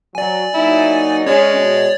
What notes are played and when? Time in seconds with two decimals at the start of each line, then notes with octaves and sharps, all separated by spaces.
0.15 F#3 D5 G#5
0.54 F#3 A#3 D#4 E4
1.26 G#3 C#4 C#5 D5
1.55 B2